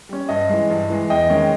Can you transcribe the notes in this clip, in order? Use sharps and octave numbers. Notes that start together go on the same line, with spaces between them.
G3 C#4
G2 D#5
E3 G#3
G2
E3 G#3
E2 D#5 G5
D#3 G#3 C#4